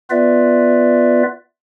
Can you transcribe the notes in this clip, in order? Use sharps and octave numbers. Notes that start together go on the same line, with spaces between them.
B3 F4 B4 D5 E5